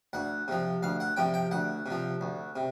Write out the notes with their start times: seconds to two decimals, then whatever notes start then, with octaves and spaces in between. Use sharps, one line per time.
0.13 D2 F#5
0.48 C3 F3
0.83 D2 F5
1.00 F#5
1.16 C3 F3 G5
1.34 G5
1.51 D2 F#5
1.86 C3 F3
2.21 D2
2.56 C3